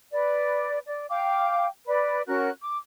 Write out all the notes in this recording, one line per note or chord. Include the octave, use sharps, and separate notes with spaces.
B4 D5
D5
F5 G5 D6
B4 D5
C#4 F#4 A#4 F#6
D6